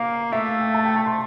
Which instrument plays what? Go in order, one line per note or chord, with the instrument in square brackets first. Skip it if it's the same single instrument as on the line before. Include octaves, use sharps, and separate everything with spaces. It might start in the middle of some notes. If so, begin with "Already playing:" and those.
Already playing: [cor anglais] A#3 [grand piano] F5
[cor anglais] A3 [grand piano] E5
[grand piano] F5
G5
A5
G5
A5
C6